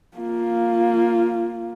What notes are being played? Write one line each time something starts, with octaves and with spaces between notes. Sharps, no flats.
A#3 F4